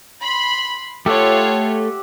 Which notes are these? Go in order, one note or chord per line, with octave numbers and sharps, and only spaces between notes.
B5 C6
A3 F4 G4 A4 C#5 E5 F#5